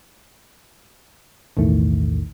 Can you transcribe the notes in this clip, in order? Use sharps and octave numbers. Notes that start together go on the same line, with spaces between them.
B1 E2 A2 D#3 A3